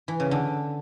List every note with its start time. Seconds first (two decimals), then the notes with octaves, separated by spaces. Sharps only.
0.08 E3
0.20 C#3
0.31 D3